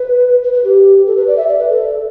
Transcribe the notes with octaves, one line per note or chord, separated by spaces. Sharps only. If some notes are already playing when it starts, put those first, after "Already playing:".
Already playing: B4
B4
B4
G4
A4
B4
D5
E5
D5
B4
A4